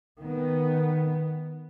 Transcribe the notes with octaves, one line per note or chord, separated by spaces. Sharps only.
D#3 B3